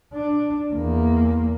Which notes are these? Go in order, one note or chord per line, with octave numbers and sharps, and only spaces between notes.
D4
E2 A#3